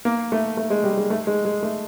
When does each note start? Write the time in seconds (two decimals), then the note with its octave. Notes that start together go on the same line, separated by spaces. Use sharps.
0.05 A#3
0.32 A3
0.57 A3
0.70 G#3
0.84 G3
0.98 G#3
1.10 A3
1.27 G#3
1.45 G#3
1.63 A3